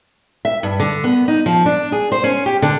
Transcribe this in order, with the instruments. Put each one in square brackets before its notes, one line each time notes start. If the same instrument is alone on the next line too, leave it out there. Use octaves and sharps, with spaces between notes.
[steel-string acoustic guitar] E5
G2
D3
B3
D#4
F3
D4
G#4
C5
C#4
G4
D3